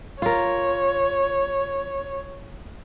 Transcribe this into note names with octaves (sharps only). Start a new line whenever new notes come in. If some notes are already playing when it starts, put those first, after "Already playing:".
F4 A#4 C#5